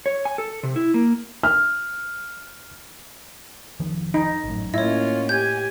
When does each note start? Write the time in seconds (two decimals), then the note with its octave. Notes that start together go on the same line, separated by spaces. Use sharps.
0.06 C#5
0.25 G#5
0.38 A4
0.63 C3
0.76 E4
0.94 A#3
1.43 F6
3.80 F1 D#3 F3
4.14 D#4
4.44 G#1 F#2 A2
4.74 A2 A#3 C#4 E4 F4 C#5 D#5
5.29 G4 G#5 G6 G#6